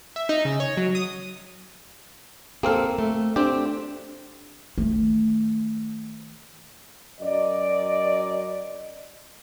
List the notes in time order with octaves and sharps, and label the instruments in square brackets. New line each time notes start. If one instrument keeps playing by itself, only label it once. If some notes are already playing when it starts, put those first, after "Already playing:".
[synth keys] E5
D#4
C#3
C#5
F#3
D#6
[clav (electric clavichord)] A#3 C4 F5 [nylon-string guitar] G#4 A4
[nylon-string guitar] A3
[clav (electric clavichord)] C4 G4 [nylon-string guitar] D4
[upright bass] D#3 A3
[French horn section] F#2 F#3 D5 D#5